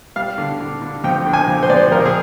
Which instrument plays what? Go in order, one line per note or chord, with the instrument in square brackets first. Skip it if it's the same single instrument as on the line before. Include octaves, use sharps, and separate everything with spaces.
[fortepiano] G3 F5
D3
D3
D3
F2 G5
D3
G#5
F2
C5
F2 D5
C5
F2 A#4
G#4